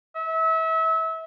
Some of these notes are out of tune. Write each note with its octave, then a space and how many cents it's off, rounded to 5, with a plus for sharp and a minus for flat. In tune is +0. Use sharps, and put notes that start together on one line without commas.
E5 -30